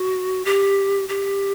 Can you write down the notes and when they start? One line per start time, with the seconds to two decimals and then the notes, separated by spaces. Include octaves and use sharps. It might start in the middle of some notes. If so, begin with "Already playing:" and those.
Already playing: F#4
0.45 G4
1.09 G4